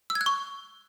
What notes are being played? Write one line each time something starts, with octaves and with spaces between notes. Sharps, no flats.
E6
G#6
F#6
C#6